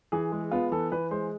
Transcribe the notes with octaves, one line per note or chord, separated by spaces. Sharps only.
E3 G#4
G#3
B3 F4
E3 A4
E3 B4
G#3 C5